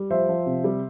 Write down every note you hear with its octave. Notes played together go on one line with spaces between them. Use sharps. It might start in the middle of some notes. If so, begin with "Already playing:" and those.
Already playing: G3
F3 C5 E5
F3
C3
G3